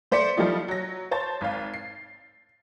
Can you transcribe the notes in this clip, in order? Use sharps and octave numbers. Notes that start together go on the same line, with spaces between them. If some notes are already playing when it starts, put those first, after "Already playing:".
A3 C5 D5 B6 C#7
F3 G3 A3 D#4 F4 D5
F#3 A#6
C5 C#5 A5 A6
G#1 F5
C7